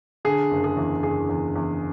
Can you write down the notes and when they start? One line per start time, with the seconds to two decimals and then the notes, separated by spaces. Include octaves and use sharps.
0.25 D3 G#4
0.51 F#1
0.64 G#4
0.77 E2
1.03 F#1 G#4
1.29 E2
1.56 E2